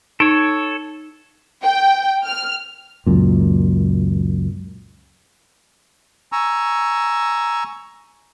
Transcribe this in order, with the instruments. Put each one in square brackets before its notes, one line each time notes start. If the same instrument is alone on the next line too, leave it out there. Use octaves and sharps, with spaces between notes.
[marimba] D#4 [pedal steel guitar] A4 C#5
[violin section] G5
F6
[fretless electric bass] C#2 F#2 A#2
[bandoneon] G#5 A#5 C#6 E6